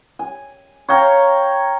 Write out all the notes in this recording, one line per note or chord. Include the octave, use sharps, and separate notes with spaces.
G#5
C#5 F5 G5 A#5